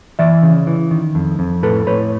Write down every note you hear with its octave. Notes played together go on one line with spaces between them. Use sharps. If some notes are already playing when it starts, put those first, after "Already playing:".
E3 D5 E5
C#3
E3
D#3
F2
F2
A2 A4 B4
A2 B4 C#5